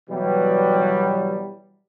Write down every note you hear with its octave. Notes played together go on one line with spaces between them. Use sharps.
B2 E3 F#3 G3